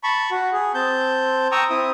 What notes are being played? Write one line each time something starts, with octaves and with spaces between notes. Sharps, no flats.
A5 B5 C#6
F#4
G#4
C4 A5 G6
G5 A#5 C#6 D#6 E6
C4 E4 D#6